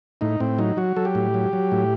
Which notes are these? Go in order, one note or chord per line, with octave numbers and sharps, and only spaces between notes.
A2 D#4
A2 C4
F#3 D#4
F#3 F#4
F#3 A4
G4
A2
F#3
F#3
A2